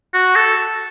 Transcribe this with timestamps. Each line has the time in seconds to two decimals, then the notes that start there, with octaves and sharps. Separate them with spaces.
0.14 F#4
0.36 A4